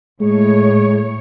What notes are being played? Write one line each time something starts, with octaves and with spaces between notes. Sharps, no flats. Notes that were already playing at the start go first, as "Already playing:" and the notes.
A2 G#3 C#5